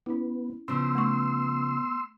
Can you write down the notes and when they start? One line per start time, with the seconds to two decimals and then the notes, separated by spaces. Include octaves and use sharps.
0.06 B3 C#4 E4
0.68 C#3 F3 B3 C6 E6
0.95 A3 C#6